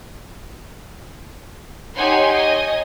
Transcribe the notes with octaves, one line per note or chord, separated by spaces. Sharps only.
D#4 G4 C#5 F#5 G#5 C6
C#5 D#5 G#5